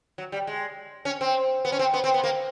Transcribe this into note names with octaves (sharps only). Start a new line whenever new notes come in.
F#3
G3
G#3
C#4
C4
B3
C#4
C4
B3
C4
B3
A#3